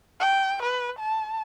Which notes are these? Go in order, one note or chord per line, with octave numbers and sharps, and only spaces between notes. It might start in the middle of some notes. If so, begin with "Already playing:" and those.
G5
B4
A5